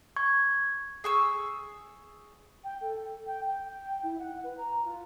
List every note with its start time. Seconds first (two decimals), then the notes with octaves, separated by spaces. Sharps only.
0.16 C#6 G#6
1.04 G#4 C#6 E6
2.63 G5
2.80 A4
3.26 G5
3.47 G5
4.02 E4
4.18 F#5
4.43 B4
4.57 A#5
4.84 F4